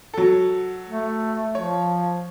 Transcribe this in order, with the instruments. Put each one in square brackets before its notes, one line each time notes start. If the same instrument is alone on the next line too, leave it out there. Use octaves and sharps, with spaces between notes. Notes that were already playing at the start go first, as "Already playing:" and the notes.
[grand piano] F#3 A4
[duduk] A3
[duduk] F3 [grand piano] C#5